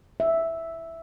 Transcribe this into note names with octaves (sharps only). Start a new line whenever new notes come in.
E5